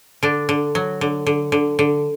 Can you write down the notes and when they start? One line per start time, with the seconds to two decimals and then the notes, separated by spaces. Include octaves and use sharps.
0.23 D3 D4
0.49 D3
0.75 F#3
1.01 D3
1.26 D3
1.52 D3
1.79 D3